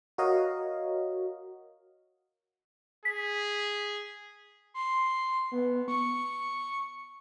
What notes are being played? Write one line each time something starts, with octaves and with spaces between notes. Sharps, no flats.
F#4 A#4 C#5 D#5 F5
G#4 B6
C6
B3
C#6